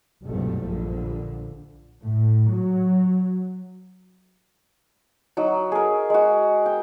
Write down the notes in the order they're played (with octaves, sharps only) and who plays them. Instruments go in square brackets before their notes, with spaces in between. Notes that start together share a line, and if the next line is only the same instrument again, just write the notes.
[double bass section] F#1 C2 G2 B2 F3 A3
A#1 D3
A2
F#3
[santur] F#3 D#4
G#4 A#4
G#3 F#4
G5